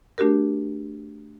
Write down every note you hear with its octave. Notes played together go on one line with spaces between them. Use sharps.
A3 D4 F#4 G4 A#4